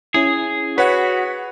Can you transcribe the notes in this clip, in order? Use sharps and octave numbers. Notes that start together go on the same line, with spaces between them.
C#4 E4 G#4
F#4 B4 C#5 F#5 B6